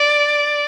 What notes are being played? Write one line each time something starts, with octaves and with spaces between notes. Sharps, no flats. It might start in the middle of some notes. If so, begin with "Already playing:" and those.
Already playing: D5